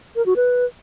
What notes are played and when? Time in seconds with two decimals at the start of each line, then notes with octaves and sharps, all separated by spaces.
0.16 A#4
0.26 F#4
0.36 B4